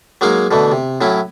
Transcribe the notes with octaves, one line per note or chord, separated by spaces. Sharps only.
F#3 G#3 A#3 D#4 A#4 F5
B2 D3 E3 A3
C3
A2 F#3 C#4 E4